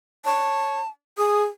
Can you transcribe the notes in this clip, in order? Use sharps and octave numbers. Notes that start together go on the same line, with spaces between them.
C#5 A5
G#4 D#6